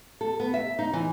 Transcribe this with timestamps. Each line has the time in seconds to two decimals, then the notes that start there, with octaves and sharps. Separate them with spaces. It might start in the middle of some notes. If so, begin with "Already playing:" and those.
0.21 A4
0.40 B3
0.54 E5
0.79 D#4
0.93 E3